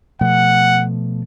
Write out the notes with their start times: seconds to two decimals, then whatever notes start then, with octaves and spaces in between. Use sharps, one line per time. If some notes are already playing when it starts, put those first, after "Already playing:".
0.21 B2 F3 A3 F#5